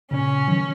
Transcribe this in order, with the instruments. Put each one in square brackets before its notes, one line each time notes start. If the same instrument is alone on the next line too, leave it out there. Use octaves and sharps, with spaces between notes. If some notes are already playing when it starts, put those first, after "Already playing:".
[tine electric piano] A#2 C#3 [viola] C#4
[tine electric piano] D#3 F#3